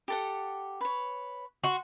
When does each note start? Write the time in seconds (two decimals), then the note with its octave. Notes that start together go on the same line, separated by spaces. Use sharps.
0.08 G4 A4 F#5
0.81 B4 C#5
1.64 F#4 C6